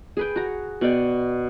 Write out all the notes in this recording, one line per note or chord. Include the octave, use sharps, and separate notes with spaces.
G#4 B4 G5
F#4 A#5
B2 D5 G5